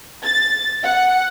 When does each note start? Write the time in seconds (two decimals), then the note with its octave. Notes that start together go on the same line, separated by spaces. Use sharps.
0.25 A6
0.84 F#5